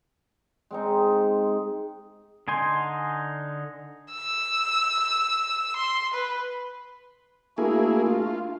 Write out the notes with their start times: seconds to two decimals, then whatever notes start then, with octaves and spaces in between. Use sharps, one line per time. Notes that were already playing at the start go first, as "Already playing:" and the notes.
0.71 G#3 C4 D#4
2.48 D3 D#4 G#5 C6
4.13 E6
5.76 C6
6.14 B4
7.58 A3 A#3 D4 E4 F#4 G#4
8.06 F4